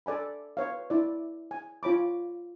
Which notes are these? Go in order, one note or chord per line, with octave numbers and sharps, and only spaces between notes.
A4 D5 G#5 B5
B4 C#5 F5
E4 D5
G#5
F4 C#5 B5 D6